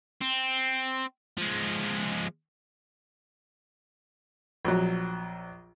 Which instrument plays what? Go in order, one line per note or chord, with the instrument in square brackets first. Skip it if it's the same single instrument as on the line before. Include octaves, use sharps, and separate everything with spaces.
[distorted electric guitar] C4
F3 G#3
[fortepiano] A#1 F#3